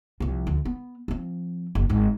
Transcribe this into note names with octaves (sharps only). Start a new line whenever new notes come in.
C2 F3
D2
B3
F3 C4
F#1
G#1 G#2